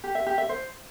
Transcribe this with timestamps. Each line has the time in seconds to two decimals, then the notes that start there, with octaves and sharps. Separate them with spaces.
0.04 G4
0.15 E5
0.26 G4
0.38 E5
0.49 C5